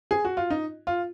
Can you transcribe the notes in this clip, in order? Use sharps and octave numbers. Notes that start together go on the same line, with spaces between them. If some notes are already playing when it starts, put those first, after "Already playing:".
G#4
F#4
F4
D#4
F4